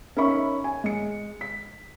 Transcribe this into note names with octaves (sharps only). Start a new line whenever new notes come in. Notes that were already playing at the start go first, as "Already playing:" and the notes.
C#4 D#4 A#4 E5 B5 C#6
G#5
G#3 C#7
B6